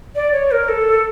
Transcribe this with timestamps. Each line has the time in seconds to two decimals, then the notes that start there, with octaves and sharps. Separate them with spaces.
0.15 D5
0.33 C#5
0.52 A#4
0.69 A4